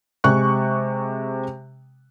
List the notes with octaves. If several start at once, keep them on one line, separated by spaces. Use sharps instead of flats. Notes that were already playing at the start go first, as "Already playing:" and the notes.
C3 G#3 C#6 F#6